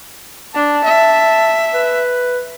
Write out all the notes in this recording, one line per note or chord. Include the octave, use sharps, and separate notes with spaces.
D4 A5
E5
B4